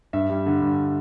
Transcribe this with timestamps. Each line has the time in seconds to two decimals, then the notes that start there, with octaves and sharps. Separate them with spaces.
0.13 G2 E5
0.30 G3
0.46 D3
0.62 G2